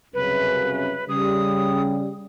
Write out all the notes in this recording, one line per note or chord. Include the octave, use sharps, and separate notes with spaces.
C2 F#2 C#3 B4
C#3 G3 D#6